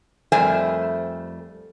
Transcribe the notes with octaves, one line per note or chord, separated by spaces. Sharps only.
F2 G3 A3 A#4 C5 G#5